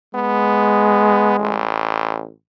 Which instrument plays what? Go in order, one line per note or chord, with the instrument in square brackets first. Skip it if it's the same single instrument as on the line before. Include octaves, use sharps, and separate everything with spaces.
[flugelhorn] G#3 [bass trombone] B3
[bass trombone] A1